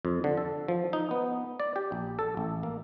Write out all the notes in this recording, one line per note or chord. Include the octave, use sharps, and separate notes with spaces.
F2
D3
A4
F3
D#4
B3
D5
G4
A#1
A4
A1
A#3